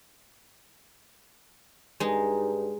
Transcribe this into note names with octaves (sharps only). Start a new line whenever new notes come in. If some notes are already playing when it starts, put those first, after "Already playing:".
G2 G#3 D#4